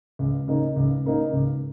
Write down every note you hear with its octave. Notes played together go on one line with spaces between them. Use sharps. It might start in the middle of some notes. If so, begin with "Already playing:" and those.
C#2
C#3 A#3 D#4
C#2
C#3 A#3 D#4
C#2